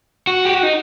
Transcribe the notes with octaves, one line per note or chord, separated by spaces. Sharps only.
F#4
G4
F#4
D#4